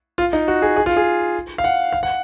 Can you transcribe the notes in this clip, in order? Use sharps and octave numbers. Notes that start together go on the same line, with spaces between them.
F4
D#4
F#4
G#4
G#4
F4
G#4
F5
F#5
F5
F#5